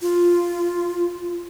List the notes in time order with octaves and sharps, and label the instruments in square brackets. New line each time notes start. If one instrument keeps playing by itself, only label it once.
[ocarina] F4